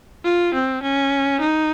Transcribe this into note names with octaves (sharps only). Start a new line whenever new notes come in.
F4
C4
C#4
D#4